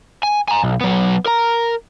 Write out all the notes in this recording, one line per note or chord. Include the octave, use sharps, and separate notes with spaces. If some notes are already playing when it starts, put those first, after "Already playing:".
G#5
G#5 A#5
B1
F#3 B3
A#4 A#5